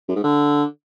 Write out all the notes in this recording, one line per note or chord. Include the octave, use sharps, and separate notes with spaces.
F#2
G#2
D3